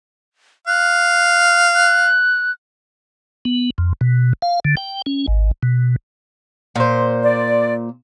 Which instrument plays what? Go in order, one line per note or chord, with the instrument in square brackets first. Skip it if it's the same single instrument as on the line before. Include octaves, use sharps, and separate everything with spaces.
[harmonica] F5 [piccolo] F#6
[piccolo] F#6
[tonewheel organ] B3
F2
B2
F5
D3
G5
C#4
G#1
B2
[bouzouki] A#2 C5
[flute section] D5